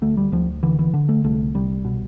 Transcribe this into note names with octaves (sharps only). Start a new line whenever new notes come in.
D2 A3
G3
D2 F3
D3 E3
E3
D3
A3
C2 A3
C2 G3
B2